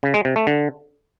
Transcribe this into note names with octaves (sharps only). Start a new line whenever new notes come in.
C#3
G#3
C3
A3
D3